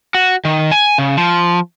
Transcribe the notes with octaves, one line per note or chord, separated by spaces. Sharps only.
F#4
D#3
G#5
C#3
F3